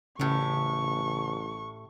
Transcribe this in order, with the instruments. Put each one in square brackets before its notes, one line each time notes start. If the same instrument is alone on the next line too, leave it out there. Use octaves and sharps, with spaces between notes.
[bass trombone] A1 [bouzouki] A2 G4 [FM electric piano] C#3 [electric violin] C#6